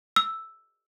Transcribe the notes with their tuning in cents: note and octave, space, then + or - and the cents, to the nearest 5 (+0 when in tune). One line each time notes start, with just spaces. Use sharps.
E6 +0